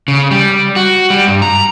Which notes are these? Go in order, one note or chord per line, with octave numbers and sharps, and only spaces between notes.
C#3
G3
F#4
G3
G2
A#5